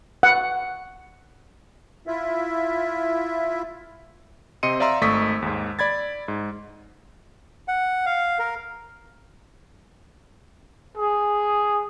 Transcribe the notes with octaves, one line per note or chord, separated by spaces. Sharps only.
F#5
E4 F4 E5
C3 C4 D#5 C6 C#7 D#7
D5 E5 F5 A#5 C6 E6
G#1 A3 D#5 C#6 D#6 B6
D#2 G#2
D5 B5 G#6 A6
G#2
F#5
F5
A#4
G#4